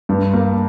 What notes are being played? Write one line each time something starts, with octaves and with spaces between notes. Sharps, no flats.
G2
A#3